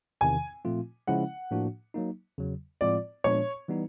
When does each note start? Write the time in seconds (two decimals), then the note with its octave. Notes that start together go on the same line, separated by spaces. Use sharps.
0.21 E2 C3 D#3 G#5
0.65 A#2 F3 A3 C4 F4
1.07 C#3 F3 G#3 C#4 E4 F#5
1.51 A2 F3 A#3 D4 F#4
1.94 F#3 A#3 D#4
2.38 E2 C#3 F#3
2.81 A2 F3 G#3 C4 F4 D5
3.24 A#2 F3 G#3 B3 D4 C#5
3.68 E3 G3 B3 D#4